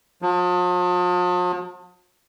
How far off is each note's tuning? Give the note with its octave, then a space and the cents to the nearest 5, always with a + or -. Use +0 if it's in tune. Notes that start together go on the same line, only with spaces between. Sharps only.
F3 +45